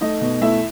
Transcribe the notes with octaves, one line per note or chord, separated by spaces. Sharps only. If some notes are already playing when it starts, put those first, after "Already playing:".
A3 D#4 D#5
B2
A3 E4 E5